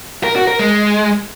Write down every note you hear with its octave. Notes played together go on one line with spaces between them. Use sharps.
A#4
F#4
A#4
G#3